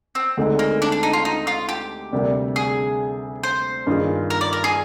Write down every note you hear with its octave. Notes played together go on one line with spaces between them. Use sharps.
C4
D2 D3 G#3 C4 D#4
A#3
D4
D4
D#4
F4
D#4
F4
G4
D2 C3 G3 A#3 D4
G#4
C5
G2 D#3 A#3 F4 G#4
A#4
D5
A#4
G#4